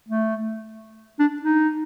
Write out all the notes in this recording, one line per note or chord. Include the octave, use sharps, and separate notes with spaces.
A3
D4
D#4